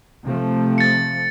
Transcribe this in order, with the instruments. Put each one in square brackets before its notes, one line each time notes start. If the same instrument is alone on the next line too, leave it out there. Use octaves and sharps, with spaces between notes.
[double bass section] C3 F3 A3
[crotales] A6 C#7